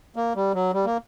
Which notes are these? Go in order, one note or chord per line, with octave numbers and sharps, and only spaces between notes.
A#3
G3
F#3
G3
A#3